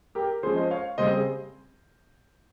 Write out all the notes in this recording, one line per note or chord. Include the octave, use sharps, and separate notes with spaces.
G4 A#4
F3 G#3 C#4 G#4 C5
C5 D#5
C#5 F5
C#3 G3 C4 C5 D#5
G#4